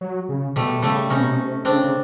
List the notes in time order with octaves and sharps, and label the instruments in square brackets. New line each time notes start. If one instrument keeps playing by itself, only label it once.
[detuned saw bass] F#3
C#3
[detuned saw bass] B2 [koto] G3 A3
[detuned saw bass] C#3 [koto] G3 A3
[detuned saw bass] C3 [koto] C#4 D#4
[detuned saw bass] B2
C3
[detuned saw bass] C#3 [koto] C4 D4
[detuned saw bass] C#3